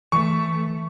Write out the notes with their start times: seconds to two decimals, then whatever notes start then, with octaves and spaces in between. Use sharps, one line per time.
0.12 E3 A3 C#6